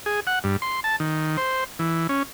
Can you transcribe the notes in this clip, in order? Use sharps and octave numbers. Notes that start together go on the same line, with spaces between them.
G#4
F#5
G2
C6
A5
D#3
C5
E3
C#4